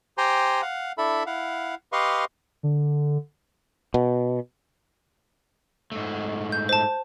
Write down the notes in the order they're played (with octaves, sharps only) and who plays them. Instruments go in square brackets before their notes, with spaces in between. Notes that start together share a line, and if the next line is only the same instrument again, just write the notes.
[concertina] G4 C5 G5 G#5 A#5 C6
F5 F#5
D4 E4 A4 E5 B5
E4 F5 F#5
G4 B4 D#5 F5 C6 C#6
[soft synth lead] D3
[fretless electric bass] B2
[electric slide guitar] G#2 A3
[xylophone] G6
C5 A5